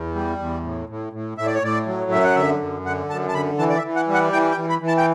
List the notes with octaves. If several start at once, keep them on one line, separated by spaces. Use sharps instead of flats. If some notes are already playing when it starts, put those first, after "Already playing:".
Already playing: E2
G3
E2
A2
A2
A2
A2 E5
D5
C#5
A2 D5
F#3
F#2 E5
F#5
D3 E5
F#2
D3 F#5
F#2 A5
A5
D3 B5
E3 A5
D5
E5
E3
F#5
G3
F#5
E3 G5
G5
E3
B5
E3
A5
G5